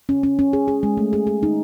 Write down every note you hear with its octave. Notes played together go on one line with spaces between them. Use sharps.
C#4
C#4
C#4
G#4
G#4
G#3
A3
G#4
G#4
D#4